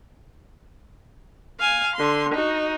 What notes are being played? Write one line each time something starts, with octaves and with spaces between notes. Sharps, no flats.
F5 G#5
D3 C6
D#4 F#4